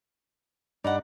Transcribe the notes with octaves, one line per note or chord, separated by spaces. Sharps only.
G2 D4 D#4 B4 D5 F#5